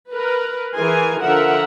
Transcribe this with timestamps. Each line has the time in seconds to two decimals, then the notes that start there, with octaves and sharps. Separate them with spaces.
0.11 A#4 B4
0.75 E3 G#4 A#4 G#5 C6
1.22 D3 F3 A#4 E5 F#5